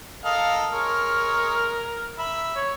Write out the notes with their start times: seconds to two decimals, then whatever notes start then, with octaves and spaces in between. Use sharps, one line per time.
0.25 A4 A#4 D#5 F5
0.73 G#3 A#4 C#5 F6
2.19 E5 B5
2.56 C#5